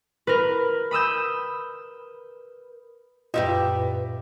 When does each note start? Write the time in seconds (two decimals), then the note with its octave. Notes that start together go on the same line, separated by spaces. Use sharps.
0.27 A#4 B4
0.91 B5 D#6 E6 G6
3.34 F#2 A#2 G3 F4 G4 B4 D#5 E5